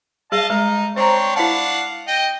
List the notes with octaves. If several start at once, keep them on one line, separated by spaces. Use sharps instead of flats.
G3 G#4 D#5 F5 A5
G#3 D#4
C4 D4 C5 C#5 A#5
D4 E4 F5 F#5 A5
D#5 G5